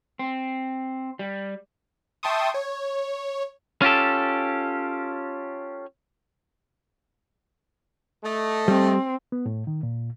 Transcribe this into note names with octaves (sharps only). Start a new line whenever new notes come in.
C4
G3
E5 G5 A5 C6 C#6 D#6
C#5
C#4 F4 G4 A4
A3 D#5
G3 C4
B3
A2
D#3
A#2